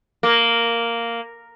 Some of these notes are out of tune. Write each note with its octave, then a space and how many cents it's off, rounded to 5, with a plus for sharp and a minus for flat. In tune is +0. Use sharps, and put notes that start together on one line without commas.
A#3 -5